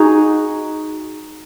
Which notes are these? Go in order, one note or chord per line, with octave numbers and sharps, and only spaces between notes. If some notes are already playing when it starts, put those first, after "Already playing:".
Already playing: D#4 F#4 G#4